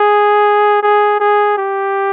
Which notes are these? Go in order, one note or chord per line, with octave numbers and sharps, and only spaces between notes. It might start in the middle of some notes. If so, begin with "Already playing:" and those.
Already playing: G#4
G#4
G#4
G4